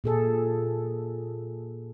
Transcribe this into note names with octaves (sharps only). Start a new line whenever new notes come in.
A#2 G#4 A4